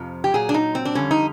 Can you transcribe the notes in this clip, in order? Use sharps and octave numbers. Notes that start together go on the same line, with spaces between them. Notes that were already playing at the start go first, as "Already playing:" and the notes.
Already playing: F2 C3 F3
G4
A#2 F#3 G#4
D4
D#4
C4
D4
F2 D3 G3 C#4
D#4